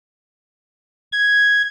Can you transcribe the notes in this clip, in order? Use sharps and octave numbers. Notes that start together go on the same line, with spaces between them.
G#6